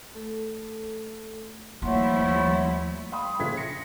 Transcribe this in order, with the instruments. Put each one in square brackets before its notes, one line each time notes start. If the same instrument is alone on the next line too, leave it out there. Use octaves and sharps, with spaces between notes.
[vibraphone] A3 A4
[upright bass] D#2 [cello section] F3 G3 E4 [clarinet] A3 [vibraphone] C#5 F#5 C6
[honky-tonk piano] F5 G5 B5 C6 D#6
A#1 C#3 G#6 B6
A#6 C#7